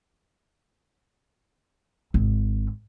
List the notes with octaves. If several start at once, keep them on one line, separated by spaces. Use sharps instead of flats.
G#1